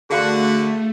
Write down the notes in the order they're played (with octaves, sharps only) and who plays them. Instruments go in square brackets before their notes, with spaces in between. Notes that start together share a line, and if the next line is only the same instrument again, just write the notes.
[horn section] D3 F#4 [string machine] A3 [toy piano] G#4 F5 C6